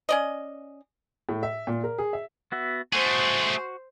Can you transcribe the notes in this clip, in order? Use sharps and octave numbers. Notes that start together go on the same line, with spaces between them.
C#4 D5 D#5
A2
E5
A#2
A#4
G#4
E5
B3 F#4 E5
A3 F#4 G#4 C5